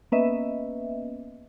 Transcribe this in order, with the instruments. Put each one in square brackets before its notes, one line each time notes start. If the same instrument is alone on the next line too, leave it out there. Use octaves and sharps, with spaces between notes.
[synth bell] A#3 B3 C#4 B4 D#5 E5